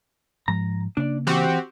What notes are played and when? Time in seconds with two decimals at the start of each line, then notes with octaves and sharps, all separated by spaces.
0.48 G#2 F3 G#3 A#5
0.97 C#3 A#3 D4 D5
1.27 E3 C4 F#4 G4